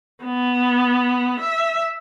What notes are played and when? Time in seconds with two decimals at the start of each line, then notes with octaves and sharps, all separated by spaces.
0.24 B3
1.40 E5